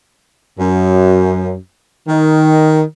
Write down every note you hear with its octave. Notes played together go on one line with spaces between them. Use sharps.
F#2
D#3